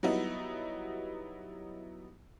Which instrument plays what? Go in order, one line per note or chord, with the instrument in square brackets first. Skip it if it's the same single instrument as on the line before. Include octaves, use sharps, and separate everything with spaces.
[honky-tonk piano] F#3 G3 B3 D#4 E4